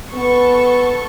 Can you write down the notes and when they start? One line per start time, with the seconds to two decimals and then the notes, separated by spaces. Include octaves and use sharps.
0.14 B3 A4 C#6